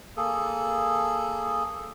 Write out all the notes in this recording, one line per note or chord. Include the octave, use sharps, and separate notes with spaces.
A#3 G#4 A4